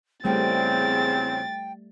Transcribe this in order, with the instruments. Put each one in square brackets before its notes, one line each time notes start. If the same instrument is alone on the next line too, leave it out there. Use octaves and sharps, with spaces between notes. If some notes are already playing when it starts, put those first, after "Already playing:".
[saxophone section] E2 C#3 C4 [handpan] G3 A3 [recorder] G5 [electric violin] A6